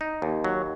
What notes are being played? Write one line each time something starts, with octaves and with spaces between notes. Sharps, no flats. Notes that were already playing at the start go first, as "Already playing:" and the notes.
D#4
D#2
F#3